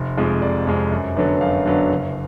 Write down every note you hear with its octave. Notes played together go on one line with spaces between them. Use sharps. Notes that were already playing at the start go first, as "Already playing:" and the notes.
Already playing: F1
F2 F3 G#3
F1 D5
F2 F3 G#3
F#2
D3 F#3 B3 D4
F#2 F5
D3 F#3 B3 D4
F#1